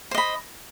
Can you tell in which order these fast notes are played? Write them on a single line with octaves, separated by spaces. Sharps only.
C5 D#5 B5